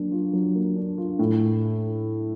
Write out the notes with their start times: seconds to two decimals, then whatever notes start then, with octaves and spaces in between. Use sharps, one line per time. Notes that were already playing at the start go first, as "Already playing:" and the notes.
Already playing: F#3 A#3 D4
0.12 F4
0.33 F#3
0.55 A#3
0.76 D4
0.98 F4
1.19 A2